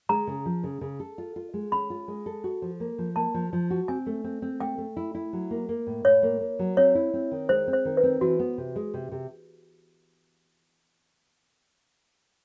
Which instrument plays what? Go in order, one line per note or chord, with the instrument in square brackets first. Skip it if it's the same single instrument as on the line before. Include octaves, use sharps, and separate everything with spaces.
[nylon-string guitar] G#3 [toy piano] A#5
[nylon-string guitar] C#3
F3
C#3
C#3
A4
F4
F4
G#3
[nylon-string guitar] C#4 [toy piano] B5
[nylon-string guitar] F4
G#3
A4
F#4
F3
A#3
F3
[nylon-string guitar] A#3 [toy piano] A5
[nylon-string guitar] F3
F3
F#4
[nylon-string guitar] C4 [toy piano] G#5
[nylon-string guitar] A3
C4
C4
[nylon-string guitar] A3 [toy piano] G5
[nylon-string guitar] A3
E4
E4
F#3
A#3
A#3
A2
[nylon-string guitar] A2 [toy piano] C#5
[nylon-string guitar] A#3
A#3
F#3
[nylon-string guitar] C4 [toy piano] C#5
[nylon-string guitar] E4
C4
D#3
[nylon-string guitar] G#3 [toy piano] C5
[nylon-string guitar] C4
[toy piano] C5
[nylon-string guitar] D#3
[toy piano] B4
[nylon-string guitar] C4
[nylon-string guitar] E3 [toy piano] F#4
[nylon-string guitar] B3
C3
G#3
C3
C3